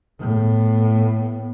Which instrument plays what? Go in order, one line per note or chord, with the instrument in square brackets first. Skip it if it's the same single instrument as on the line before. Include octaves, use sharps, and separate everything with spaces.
[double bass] A2 B3